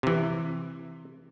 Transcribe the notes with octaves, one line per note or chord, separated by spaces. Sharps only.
C3 E3